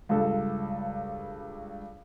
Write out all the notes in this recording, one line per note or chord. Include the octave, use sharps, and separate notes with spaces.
C#2 G2 A4